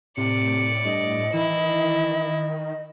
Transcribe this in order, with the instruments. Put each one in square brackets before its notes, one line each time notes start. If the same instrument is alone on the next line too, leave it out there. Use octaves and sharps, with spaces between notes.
[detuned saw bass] A2 [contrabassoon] C3 [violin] D5 C#7
[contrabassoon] G2 [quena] D#5
[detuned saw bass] D#3 [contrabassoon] E3 [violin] E4